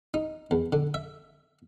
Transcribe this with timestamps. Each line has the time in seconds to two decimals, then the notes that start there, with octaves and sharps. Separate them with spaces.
0.14 D#4
0.51 E2
0.72 D3
0.94 E5